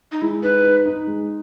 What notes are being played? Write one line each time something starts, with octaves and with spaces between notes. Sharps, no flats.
D#4
G#3 E4
D#4 B4
D#4
D#4
G#3